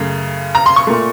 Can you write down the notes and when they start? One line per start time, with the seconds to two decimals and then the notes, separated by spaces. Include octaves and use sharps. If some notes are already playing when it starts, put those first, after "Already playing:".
Already playing: F#2 C#3 A3
0.55 A#5
0.66 C6
0.76 C#6
0.87 A#2 A3